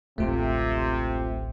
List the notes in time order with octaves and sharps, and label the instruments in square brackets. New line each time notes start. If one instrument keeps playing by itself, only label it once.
[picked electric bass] D1 A1 [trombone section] C3 [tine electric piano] A3 F4